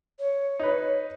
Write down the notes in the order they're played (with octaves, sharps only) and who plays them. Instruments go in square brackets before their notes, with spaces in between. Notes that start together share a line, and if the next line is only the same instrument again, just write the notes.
[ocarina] C#5
[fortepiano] D#4 B4